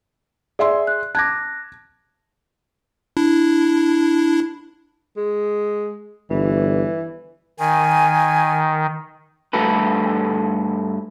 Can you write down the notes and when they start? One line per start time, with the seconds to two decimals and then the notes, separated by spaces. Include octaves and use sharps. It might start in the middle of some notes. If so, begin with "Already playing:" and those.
0.59 G#4 D5 E5 C6
0.87 F#6
1.15 A5 D6 F#6 G#6 A#6
3.17 D4 E4
5.17 G#3
6.30 G1 E3
7.59 D#3 G#5
9.53 G2 A3 F#4 A4 B4